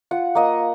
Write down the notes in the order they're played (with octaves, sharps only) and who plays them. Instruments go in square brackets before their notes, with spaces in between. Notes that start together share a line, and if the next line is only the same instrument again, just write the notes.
[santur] F4 F#5
A#3 D#5